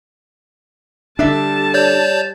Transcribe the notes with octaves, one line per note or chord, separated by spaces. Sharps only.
D3 G3 D4 A4 E5 A5
C#5 D5 G6